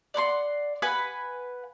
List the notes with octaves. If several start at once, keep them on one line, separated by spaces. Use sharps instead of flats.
D5 F#5 B5 C6
B4 F#5 G#5 B5